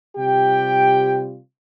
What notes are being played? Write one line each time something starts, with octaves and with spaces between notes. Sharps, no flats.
C3 G3 F4 G4 G5